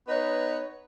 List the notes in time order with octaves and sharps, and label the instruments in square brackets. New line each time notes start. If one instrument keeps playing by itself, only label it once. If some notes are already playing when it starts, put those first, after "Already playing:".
[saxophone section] B3 D#4 B4 C#5